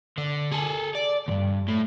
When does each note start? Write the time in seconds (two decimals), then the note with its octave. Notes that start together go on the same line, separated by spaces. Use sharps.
0.18 D3
0.52 G#4 A4
0.95 D5
1.28 D2 G2
1.68 A2